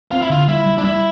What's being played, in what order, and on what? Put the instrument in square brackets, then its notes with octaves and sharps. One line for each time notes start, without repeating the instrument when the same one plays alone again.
[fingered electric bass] C4 [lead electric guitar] F4
[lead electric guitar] E4
[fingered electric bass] D3 [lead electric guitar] F4
[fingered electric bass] G3 [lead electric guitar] E4
[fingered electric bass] G3
[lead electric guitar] D4
[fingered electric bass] G3 [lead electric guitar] E4